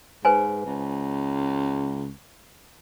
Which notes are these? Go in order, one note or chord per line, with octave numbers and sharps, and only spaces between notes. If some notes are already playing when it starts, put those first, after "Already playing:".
G#2 B4 C5 G#5
C#2